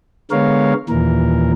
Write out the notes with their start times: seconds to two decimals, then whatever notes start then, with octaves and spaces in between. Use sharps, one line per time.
0.31 D3 G#3 B3 A#4 C#5 F5
0.89 D#2 A#2 E3 A#4